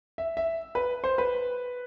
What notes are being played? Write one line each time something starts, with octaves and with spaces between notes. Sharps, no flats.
E5
E5
B4
C5
B4